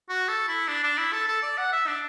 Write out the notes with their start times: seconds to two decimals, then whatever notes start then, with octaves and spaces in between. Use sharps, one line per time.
0.09 F#4
0.28 A4
0.48 E4
0.68 D4
0.84 D4
0.98 E4
1.13 A4
1.28 A4
1.43 D5
1.57 F#5
1.72 E5
1.87 D4